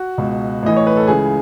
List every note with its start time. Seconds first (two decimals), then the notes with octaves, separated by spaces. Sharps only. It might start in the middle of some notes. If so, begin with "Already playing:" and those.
Already playing: F#4
0.18 C#2 B2
0.63 A1 A2 E3 D#5
0.77 C#5
0.87 B4
0.97 A4
1.07 C#2 C#3 E3 G#4